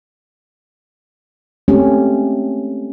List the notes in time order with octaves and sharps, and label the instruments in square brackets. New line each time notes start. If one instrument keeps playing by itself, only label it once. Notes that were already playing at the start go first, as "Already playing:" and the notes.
[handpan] G#3 A3 C4 C#4 G4